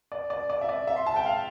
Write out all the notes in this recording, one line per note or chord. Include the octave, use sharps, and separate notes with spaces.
D5
D5
D5
E5
D5
E5
C6
A5
G5
F5